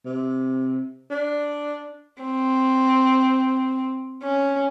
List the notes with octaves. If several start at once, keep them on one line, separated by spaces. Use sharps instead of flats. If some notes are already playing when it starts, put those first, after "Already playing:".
C3
D4
C4
C#4